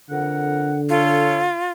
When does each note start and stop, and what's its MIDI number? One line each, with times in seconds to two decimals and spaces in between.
0.10 0.80 41
0.10 1.54 50
0.10 0.80 70
0.10 0.80 78
0.89 1.72 65
0.89 1.40 69
0.89 1.40 73